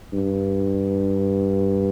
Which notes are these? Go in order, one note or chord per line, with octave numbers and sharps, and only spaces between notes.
G2